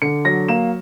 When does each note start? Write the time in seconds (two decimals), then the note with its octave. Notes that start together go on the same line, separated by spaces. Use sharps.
0.02 D3 C#7
0.25 F#3 A#6
0.48 A#3 E7